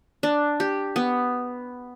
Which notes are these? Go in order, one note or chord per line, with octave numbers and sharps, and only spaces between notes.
D4
G4
B3